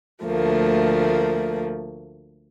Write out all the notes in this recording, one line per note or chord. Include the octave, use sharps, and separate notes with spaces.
D2 F3 A3 A#3